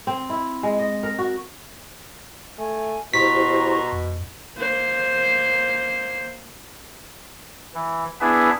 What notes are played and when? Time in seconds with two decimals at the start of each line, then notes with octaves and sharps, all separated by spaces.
0.07 C4
0.29 E4
0.63 G#3
0.79 D#5
1.03 A#4
1.18 F#4
2.58 A3 G#5
3.14 B2 E4 G4 C5 A#5 C6 C#6 B6
3.93 F2
4.58 A#3 C5
7.74 E3
8.21 B3 D4 E4 G#4 B4 E5